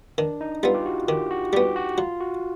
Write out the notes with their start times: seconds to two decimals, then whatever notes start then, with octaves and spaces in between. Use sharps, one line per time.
0.18 D#3 D4
0.41 D#4
0.63 G3 B3 F4
0.75 G4
0.86 F#4
1.08 D#3 G4
1.31 F#4
1.53 G3 B3 G4
1.76 F#4
1.98 F#3 F4
2.20 F#4